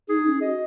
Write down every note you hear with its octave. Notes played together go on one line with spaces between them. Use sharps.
D#4 G#4
C#4
F#4 D#5